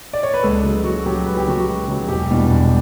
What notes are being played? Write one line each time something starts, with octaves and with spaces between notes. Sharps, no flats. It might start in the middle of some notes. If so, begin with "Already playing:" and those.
D5
C#5
B4
C#2 A4
C#3 F#3
C#2 F#4
C#3 F#3 G4
C#2 B4
G4
C#3 F#3 F#4
F#4
C#2
C#3 F#3
E1 G4
E2 B2 G3 D4
E1